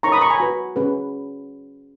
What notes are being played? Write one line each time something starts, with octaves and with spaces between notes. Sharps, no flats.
D#4 A#4 C#5 A#5 C#6
B5 D#6
A#5 C#6
G#5 B5
F#4 B4
C#4 G#4 B4